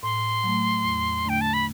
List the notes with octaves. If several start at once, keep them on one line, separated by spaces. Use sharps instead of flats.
A2 C6
F#3 A3
E2
D3 A3 D4 G5
A5
B5